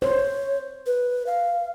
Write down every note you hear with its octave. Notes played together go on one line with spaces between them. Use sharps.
C5 C#5
B4
F5